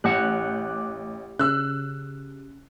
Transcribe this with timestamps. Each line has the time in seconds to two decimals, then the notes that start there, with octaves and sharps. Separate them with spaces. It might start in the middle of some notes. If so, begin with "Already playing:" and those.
0.04 A1 G4 F#5 F#6
1.39 C#3 E6 F#6